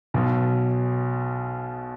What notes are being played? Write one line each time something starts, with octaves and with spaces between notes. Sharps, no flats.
B1 B2